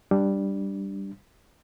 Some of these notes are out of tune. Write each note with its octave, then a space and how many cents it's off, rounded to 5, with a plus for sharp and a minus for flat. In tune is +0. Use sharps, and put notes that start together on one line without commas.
G3 +0 D4 +0